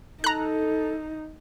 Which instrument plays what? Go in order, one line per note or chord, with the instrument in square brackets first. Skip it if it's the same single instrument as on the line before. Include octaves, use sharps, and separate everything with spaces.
[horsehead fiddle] D#4 [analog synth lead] A4 [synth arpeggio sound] A#5 F#6